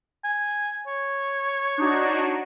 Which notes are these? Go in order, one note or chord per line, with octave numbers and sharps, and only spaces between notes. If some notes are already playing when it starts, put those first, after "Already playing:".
G#5
C#5
D4 D#4 F#4